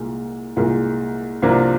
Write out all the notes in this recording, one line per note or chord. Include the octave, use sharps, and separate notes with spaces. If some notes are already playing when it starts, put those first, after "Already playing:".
Already playing: C2 A#2 G#3
C2 A#2 G#3
C2 C3 F3 A#3 D4